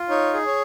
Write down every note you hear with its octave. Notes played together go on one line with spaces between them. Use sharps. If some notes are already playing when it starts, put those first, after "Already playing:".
Already playing: F4
D#4 C#5
G#4
C#5